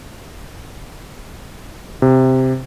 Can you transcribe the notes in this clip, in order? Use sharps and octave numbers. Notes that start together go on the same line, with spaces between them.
C3